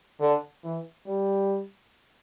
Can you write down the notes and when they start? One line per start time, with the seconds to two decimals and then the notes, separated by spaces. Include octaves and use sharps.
0.20 D3
0.64 E3
1.06 G3